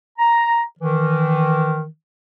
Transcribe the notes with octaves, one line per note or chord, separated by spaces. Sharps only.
A#5
D#3 E3